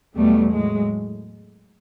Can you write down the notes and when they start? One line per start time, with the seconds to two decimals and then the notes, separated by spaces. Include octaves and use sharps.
0.16 E2 B2 F#3 G3 A3
0.53 A2 F#3 G#3